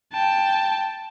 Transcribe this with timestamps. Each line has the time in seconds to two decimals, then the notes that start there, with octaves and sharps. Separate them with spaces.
0.13 G5 A5